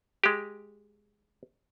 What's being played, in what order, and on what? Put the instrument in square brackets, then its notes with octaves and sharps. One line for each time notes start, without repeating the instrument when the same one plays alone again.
[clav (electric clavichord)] G#3 G4